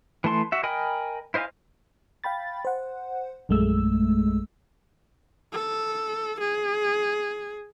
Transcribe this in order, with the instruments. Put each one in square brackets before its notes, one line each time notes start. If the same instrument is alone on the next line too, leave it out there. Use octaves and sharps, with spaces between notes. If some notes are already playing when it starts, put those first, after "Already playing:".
[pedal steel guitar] E3 A3 A5 C6
F#4 E5
A#4 D#5 G5 G#5 B5
E4 C5 D#5 F5 G#5
[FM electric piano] F5 G5 B5 A6
C5 F#5
A#1 F#2 G#3 A3 E6
[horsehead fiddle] A4
G#4